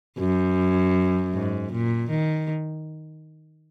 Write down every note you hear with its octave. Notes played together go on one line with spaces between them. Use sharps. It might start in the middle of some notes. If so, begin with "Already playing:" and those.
F#2
G#2
A#2
D#3